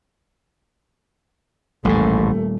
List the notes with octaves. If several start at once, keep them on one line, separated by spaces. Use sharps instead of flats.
D#1 A1 D#2 G#2 A3